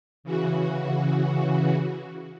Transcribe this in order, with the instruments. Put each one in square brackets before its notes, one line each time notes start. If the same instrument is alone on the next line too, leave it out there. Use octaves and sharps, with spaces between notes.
[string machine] C#3 E3 F#4